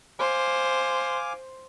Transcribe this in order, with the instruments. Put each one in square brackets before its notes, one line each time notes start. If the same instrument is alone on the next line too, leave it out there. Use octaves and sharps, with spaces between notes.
[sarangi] C5 [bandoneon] F5 G#5 D6